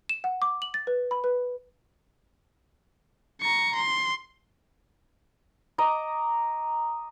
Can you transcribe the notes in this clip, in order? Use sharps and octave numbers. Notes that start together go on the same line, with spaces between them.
E7
F#5
D6
F#7
A6
B4
B5
B4
A#5 C#6
C6
D#5 A#5 D6